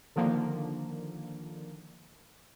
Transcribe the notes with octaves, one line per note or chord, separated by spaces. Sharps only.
D3 D#3 F3 A#3